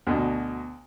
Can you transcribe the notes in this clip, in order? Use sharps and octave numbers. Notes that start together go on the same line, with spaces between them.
D2 B2